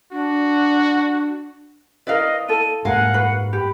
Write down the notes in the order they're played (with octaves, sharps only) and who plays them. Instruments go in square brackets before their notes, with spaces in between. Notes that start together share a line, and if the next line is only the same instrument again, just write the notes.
[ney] D4 [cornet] F#4
[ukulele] E4 A#4 [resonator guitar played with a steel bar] B4 D5 F5 [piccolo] D#5
[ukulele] E4 A4 [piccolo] D#7
[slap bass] G#2 G3 A#3 [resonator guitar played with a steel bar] A#4 F5 G#5 [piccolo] F#5
[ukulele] F#4 B4
[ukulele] G4 [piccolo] B5